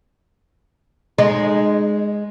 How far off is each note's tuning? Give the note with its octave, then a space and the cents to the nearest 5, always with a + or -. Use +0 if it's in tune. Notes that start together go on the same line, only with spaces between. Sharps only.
G#3 +0 D#4 -35